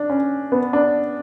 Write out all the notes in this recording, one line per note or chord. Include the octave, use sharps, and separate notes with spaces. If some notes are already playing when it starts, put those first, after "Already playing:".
Already playing: D4
C#4
B3
D4